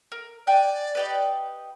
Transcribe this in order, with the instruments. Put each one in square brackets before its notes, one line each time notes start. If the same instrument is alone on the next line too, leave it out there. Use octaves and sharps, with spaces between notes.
[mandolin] A#4
[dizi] D5 [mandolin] G5 G#5 F#6
[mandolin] D#4 G4 B4